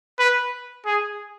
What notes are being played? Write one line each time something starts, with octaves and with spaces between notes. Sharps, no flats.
B4
G#4